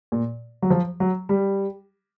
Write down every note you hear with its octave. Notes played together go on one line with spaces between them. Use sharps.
A#2
F#3
F3
F#3
G3